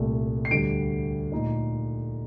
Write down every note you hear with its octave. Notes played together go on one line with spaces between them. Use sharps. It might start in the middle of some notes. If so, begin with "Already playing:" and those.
Already playing: C2 A#2 A3
C7
D2 D3 G3 D7
A#2 A3 D#4